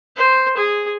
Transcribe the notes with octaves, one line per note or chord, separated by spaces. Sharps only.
C5
G#4